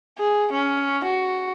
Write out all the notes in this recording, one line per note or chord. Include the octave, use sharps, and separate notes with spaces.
G#4
C#4
F#4